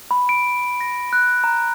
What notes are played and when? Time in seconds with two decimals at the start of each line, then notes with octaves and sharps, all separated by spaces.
0.11 B5
0.29 D7
0.81 A#6
1.13 F#6
1.44 A#5